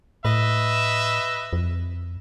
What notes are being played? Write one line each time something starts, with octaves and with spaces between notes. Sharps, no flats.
A2 B4 D#5 E5
F2